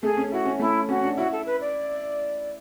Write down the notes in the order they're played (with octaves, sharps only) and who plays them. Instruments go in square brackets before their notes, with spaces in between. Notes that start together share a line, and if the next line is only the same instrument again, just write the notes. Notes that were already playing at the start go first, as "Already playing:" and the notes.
[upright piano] A3 [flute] G#4
[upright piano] C#4
[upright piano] E4 [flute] F#4
[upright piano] C#4
[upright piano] A3 [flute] E4
[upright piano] C#4 [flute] F#4
[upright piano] D4
[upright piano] E4 [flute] F#4
[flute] A4
B4
D5